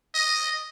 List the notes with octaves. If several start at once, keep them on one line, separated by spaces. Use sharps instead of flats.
D#5